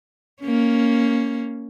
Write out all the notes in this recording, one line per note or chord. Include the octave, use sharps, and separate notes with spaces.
A#3 C#4